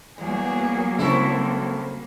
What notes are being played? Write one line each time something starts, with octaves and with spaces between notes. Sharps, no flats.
E2 F#3 G3 A#3 B3 G#4
C#3 C4 E4 A4 C5 C#6